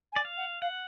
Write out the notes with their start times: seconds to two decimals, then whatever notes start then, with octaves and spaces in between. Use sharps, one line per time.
0.12 G#5
0.16 D5
0.25 F5
0.37 F#5
0.62 F5 F#5